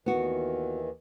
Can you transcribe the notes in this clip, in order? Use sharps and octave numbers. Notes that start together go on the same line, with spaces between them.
D#2 D#3 E3 B3 F#4